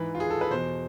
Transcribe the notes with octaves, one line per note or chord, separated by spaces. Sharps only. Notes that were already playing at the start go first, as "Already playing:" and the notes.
Already playing: G#2 E3 B4
F4
G#4
A4
B4
E2 B2 C5